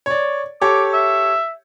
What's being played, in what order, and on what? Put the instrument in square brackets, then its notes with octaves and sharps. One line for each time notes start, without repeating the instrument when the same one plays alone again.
[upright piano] C#5 D5
[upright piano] G4 A4 C#5 [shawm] D6
[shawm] E5